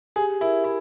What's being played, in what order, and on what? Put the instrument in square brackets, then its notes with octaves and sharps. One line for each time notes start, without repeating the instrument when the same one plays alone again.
[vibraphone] G4 [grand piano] G#4
[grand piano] E4 [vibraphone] A#4
[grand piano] E4